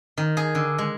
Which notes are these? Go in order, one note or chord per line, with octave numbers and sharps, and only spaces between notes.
D#3
G#4
D3
G#3